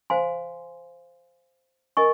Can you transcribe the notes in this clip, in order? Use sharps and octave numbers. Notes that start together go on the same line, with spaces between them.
C5 F5 G#5 C6
A#4 D#5 G#5 C#6